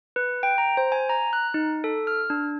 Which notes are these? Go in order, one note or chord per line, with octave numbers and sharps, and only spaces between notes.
B4
G5
A#5
C5
G#5
A#5
F#6
D#4
A4
F6
D4